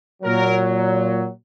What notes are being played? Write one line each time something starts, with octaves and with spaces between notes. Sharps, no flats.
A#2 F#3 A#4